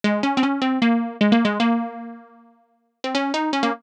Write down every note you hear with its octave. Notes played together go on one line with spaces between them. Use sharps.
G#3
C#4
C4
C#4
C4
A#3
G#3
A#3
G#3
A#3
C4
C#4
D#4
C#4
A#3